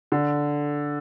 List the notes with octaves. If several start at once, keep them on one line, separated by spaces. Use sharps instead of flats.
D3